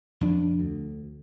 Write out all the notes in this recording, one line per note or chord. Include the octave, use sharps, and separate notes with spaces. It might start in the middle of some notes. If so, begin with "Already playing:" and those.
F2 D4
D2